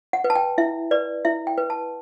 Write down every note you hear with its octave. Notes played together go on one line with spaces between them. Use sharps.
F#5
B4
A5
G5
E4 E5
B4 D5
E4 E5
G5
B4
A5